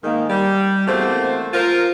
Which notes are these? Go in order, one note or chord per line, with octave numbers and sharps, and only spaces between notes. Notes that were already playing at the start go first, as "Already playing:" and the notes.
G#2 D#3 A#3
G3
E2 A3 A#3 C4 F#4 C5
F4 A#4 C5